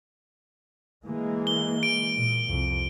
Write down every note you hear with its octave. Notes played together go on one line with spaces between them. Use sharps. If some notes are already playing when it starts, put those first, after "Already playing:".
E3 G#3 A#3
G7
D7
A#2
C2 F2